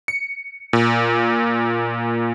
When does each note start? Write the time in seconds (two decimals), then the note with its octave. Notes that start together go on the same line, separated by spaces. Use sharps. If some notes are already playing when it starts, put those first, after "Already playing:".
0.08 C#7
0.73 A#2